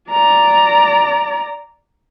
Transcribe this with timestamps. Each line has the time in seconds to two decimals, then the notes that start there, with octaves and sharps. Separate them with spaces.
0.10 D5 A#5